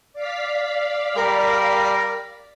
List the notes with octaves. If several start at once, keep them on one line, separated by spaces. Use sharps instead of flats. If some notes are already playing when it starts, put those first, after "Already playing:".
D5 F5 B6
G3 A#4